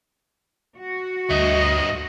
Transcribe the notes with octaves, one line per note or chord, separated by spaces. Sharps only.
F#4
D2 G2 D#5 E5